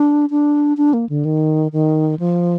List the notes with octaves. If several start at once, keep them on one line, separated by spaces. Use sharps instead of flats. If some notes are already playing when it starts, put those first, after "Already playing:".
Already playing: D4
D4
D4
A#3
D3
D#3
D#3
F3